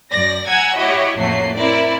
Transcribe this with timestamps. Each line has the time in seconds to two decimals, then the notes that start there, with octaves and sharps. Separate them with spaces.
0.11 F#2 D5 A#6
0.48 F#5 G#5 A#5 E6 G#6
0.76 E4 F#4 G4 C#5 D#5
1.16 A1 F2 F#3 A3 A#3 C7
1.56 C4 E4 A#4 D5